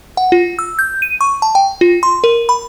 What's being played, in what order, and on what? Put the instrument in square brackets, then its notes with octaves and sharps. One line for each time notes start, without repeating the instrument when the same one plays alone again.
[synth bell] F#5
F4
E6
G6
D#7
C#6
A5
G5
F4
C6
A#4
B5